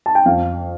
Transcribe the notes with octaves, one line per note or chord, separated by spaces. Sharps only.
A5
G5
F2 F5